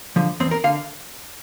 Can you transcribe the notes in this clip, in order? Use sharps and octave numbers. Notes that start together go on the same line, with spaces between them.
D3 F3
E2 C4
A#4
D3 F5